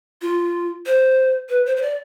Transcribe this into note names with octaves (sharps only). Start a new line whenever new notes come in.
F4
C5
B4
C5
C5
D5